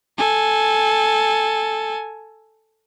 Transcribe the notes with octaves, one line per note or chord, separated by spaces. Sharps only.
A4 G#5